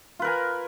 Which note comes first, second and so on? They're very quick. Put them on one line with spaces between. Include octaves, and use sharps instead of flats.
F4 B4 A#4 G#5